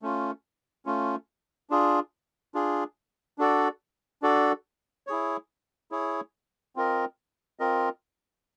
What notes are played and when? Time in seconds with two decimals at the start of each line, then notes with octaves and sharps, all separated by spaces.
0.02 A3 C#4 F4
0.86 A3 C#4 F4
1.70 D4 F4 G#4
2.54 D4 F4 G#4
3.38 D4 F#4 A4 D5
4.22 D4 F#4 A4 D5
5.07 E4 G#4 C#5
5.91 E4 G#4 C#5
6.76 C4 F4 A#4 D#5
7.59 C4 F4 A#4 D#5